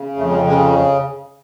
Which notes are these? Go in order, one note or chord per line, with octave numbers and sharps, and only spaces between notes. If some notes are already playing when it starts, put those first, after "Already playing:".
Already playing: C#3
F2 A3
G#3
C#3 G#3